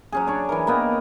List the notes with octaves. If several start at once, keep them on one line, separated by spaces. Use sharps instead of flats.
F#3 C#4 G#4
D4 C#5 D5
E3 E4 A#4
A#3 B3 D#5 G5